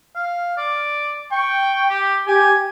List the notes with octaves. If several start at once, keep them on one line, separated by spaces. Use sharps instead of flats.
F5
D5
G5 C#6
G4
G4 G#5